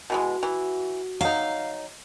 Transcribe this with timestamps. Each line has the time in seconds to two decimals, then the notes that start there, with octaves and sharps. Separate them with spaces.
0.10 B2 E3 G#3 F#4
0.43 E3
1.21 F#3 D#4 F5